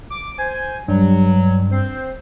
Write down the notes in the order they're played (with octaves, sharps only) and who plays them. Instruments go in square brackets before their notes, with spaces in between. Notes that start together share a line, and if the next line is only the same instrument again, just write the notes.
[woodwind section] D6
C5 G#5
[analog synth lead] G2 [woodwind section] F#3
[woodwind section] C4 C5